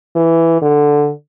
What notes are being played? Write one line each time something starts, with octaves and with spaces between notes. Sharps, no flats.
E3
D3